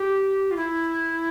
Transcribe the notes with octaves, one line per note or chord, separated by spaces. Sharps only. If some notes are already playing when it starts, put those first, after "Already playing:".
Already playing: G4
F4
E4